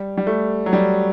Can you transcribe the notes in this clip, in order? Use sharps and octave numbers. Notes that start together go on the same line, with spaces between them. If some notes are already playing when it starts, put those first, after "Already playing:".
Already playing: G3
G3
A3
F#3
G3